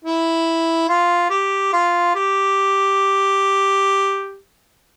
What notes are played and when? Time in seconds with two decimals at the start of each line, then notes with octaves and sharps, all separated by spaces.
0.04 E4
0.89 F4
1.30 G4
1.73 F4
2.15 G4